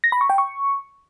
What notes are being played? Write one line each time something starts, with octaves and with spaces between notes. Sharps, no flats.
A#6
B5
C#6
G5
C#6